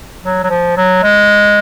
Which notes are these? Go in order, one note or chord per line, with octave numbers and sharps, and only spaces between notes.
F#3
F#3
F3
F#3
G#3